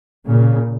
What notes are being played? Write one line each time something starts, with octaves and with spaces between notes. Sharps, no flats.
A#2 C#3